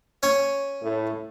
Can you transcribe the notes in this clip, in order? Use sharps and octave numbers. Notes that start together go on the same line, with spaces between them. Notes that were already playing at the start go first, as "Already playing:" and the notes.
C#4 C#5
A2